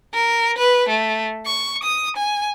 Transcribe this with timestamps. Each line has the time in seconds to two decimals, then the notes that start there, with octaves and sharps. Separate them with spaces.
0.13 A#4
0.57 B4
0.89 A3
1.46 C#6
1.83 D#6
2.16 G#5